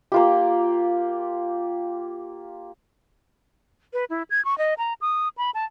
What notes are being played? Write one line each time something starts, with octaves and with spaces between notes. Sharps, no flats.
A#3 F4 G4
B4
E4
G#6
C#6
D#5
A#5
D#6
B5
A5